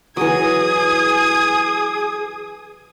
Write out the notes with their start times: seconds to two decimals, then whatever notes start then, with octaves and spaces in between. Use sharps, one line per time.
0.17 E3 F#3 G#4 D#6 G#6